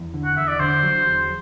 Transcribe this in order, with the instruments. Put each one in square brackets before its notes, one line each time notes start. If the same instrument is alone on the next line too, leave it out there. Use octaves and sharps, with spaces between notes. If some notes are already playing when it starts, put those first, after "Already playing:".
Already playing: [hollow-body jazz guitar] E2
D3
[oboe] F#5
[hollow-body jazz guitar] E2 [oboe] E5
[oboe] D5
[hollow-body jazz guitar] D3 [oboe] C5
[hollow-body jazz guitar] F#3
E2